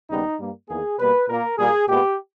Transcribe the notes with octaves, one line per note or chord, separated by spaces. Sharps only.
D#2 C#3 G3 B3 D#4
G2 G3 A#3
E2 D#3 A#3 G#4
B2 G3 A#3 B4
A#2 A#3 A#4
A#2 G3 A#3 G#4
A#2 G#3 B3 G4